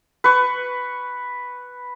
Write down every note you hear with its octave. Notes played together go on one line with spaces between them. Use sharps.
B4 C#6